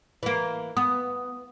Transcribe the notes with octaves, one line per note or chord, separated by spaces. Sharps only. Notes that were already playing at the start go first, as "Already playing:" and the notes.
E3 A#3
B3 D#6